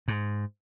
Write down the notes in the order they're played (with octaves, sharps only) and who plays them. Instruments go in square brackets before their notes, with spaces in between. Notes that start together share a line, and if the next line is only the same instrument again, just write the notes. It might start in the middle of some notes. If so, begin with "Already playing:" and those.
[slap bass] G#2